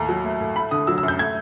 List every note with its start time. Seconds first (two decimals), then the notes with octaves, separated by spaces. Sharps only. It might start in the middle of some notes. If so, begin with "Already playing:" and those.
Already playing: D#2 A2 A#5
0.09 F#3
0.25 A3
0.40 A2
0.56 A3 B5
0.71 D3 D#6
0.87 F#3 E6
0.98 E6
1.03 F#2
1.08 G6
1.19 A3 G#6